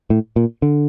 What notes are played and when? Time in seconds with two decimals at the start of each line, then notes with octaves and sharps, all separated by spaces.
0.10 A2
0.36 A#2
0.62 D3